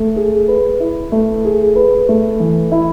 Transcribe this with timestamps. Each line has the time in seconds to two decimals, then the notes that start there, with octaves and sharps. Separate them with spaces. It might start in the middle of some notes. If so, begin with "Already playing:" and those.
Already playing: A3
0.16 G#4
0.48 B4
0.80 E4
1.12 A3
1.45 G#4
1.76 B4
2.09 A3
2.40 E3
2.72 E4